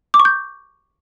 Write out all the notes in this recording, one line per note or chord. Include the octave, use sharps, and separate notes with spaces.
D6
C#6
G6